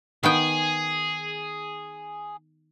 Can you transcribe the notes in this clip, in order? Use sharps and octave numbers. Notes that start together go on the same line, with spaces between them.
D#3 B3 G#4 G5